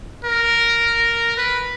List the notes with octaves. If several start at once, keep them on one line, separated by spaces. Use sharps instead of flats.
A#4
B4